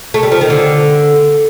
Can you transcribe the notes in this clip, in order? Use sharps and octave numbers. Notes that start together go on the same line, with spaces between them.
A3
G3
F3
D#3
D3